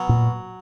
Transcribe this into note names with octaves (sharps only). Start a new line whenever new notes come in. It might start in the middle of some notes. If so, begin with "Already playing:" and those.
Already playing: B2 F#3
A#2